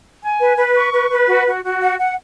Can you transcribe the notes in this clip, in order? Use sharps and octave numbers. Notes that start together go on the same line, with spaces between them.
G#5
B4
B4
C#6
B4
B4
F#4
F#4
F#4
F#5
F#5